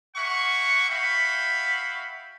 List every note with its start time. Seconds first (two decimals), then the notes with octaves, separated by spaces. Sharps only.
0.16 A#3 E5 F#5 C#6
0.89 F#4 E5 F5 G5 B5